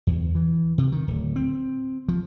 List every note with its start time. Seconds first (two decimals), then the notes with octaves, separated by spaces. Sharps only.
0.07 E2
0.35 E3
0.78 C3
0.92 D#3
1.08 D1
1.36 C4
2.09 F3